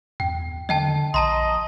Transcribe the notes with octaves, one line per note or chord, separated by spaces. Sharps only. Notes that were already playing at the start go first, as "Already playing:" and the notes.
E2 G5
D3 D#5 G5 A5
A#1 D#5 A5 A#5 C6